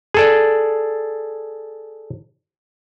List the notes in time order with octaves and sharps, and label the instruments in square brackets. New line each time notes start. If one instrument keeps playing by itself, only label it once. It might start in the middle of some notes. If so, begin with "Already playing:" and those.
[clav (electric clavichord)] G#4 A4 D5